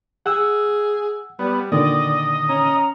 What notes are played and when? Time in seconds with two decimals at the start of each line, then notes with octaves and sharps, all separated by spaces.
0.26 G#4 F#5 E6
1.39 G3 B3
1.72 A#2 D3 D#3 D5 D#5
2.49 C#4 A#5